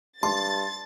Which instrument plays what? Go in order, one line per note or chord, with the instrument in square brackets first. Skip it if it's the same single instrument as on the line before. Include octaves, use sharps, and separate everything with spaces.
[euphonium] G2 [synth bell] A5 [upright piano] C6 [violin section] A6